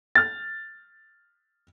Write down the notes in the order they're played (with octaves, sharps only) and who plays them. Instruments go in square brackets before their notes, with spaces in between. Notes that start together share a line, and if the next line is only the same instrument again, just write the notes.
[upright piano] F6 A6